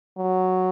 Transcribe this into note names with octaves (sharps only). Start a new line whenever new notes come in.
F#3